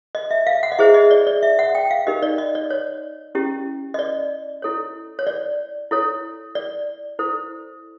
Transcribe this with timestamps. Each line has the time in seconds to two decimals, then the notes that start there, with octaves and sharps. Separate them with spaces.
0.15 D#5
0.31 E5
0.47 F5
0.63 F#5
0.72 D#5
0.79 E4 G#4 C5 E5
0.94 D#5
1.11 D5
1.27 D5
1.43 E5
1.59 F#5
1.75 G5
1.91 F5
2.07 D#4 G4 A#4 D#5
2.23 D5
2.38 D#5
2.55 D5
2.70 C#5
3.35 C#4 E4 G4
3.94 D#5
3.99 D5
4.62 E4 A4 C#5
5.19 C#5
5.27 D5
5.91 E4 A4 C#5
6.55 D5
7.19 E4 A4 C5